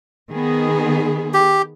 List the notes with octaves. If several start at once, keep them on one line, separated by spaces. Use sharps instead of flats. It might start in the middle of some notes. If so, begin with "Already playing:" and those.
D#3 B3 G#4
G4